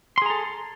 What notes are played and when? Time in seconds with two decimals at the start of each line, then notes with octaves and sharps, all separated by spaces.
0.18 C6
0.22 G#4
0.26 A#5
0.30 A4